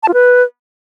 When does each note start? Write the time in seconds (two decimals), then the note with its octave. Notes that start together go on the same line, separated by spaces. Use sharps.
0.03 A5
0.08 F4
0.14 B4